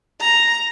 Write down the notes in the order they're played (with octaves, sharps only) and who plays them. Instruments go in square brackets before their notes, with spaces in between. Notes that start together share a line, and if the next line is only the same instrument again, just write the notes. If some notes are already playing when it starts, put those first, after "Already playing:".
[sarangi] A#5